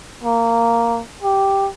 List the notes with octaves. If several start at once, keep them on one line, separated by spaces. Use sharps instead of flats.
A#3
G4